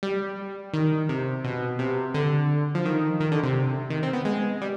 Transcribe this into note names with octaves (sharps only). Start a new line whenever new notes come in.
G3
D#3
C3
B2
C3
D3
F3
D#3
D#3
D3
C3
D#3
C4
B3
G#3
G3